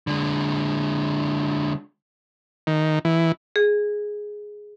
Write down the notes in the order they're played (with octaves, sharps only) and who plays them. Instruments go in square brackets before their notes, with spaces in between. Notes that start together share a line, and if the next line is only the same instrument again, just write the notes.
[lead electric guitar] D3 G#3
[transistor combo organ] D#3
E3
[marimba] G#4